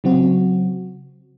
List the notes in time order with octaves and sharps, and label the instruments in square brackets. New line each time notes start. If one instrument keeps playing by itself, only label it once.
[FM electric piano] C#3 F#3 C4 F#4